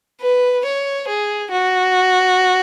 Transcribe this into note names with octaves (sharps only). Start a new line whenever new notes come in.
B4
C#5
G#4
F#4